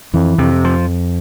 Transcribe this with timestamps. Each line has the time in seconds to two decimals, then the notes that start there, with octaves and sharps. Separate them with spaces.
0.14 F2 E3
0.38 F2 C3
0.64 F3